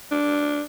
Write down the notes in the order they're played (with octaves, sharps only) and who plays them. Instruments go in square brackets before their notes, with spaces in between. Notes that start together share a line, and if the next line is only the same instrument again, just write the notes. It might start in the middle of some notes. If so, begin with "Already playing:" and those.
[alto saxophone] D4